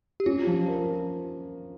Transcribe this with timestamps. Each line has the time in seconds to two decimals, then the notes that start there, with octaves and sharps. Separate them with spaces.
0.20 G4
0.26 C#4 F4
0.47 F3
0.68 A#4